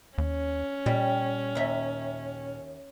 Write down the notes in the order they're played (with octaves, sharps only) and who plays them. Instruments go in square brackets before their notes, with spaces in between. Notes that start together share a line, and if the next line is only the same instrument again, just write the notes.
[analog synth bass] D#2 [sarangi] C#4
[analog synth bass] A#2 [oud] G3
[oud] D#2 E5